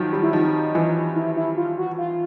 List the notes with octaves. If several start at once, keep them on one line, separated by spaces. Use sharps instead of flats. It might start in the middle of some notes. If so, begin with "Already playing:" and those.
Already playing: D#3 F3 F#3
G3
E4
F3 D#4
E3
E4
E4
F4
F#4
F4